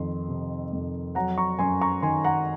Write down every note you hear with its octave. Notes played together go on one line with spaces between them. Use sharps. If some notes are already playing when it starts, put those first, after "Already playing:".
Already playing: F2 D#3 C6
C3
F2
F#3 F#5 A#5
A#5 C#6
F#2 G#5 C6
A#5 C#6
D#3 G#5 C6
F#5 A#5